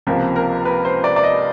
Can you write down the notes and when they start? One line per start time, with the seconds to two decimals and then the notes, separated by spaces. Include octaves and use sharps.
0.07 C#2 C3 F3 A#3
0.36 A#4
0.65 B4
0.85 C5
1.04 D5
1.16 D5
1.23 D#5